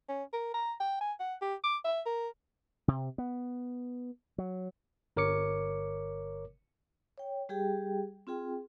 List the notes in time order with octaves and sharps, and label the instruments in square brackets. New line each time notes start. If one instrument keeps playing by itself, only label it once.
[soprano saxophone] C#4
A#4
A#5
G5
G#5
F#5
G4
D6
E5
A#4
[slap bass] C3
B3
F#3
[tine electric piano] G1 A#4 C#5 D6 C#7
[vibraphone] C#5 G5
G3 G4 G#4 G5
C4 F4 G#4 G5